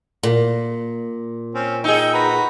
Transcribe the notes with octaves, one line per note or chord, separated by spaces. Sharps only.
A#2
C4 C#4
D#4 G#4 D#5 G5 E6
F#4 B4 A#5